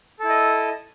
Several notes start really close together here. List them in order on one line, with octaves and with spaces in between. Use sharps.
A4 E4 D#5